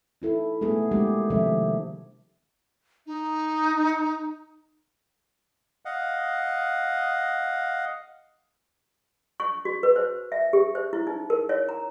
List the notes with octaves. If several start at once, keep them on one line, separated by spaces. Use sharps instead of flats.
D#4 E4 A4
A3 B3 D4 G#4 A4
G3 G#3 A#3 D4 G4
C3 D#3 F3 G3 A4 E5
D#4
D#5 F5 F#5
C#6
F#4
B4
C5
E5
G4
C5
E4
D#4
A#4
C#5
A#5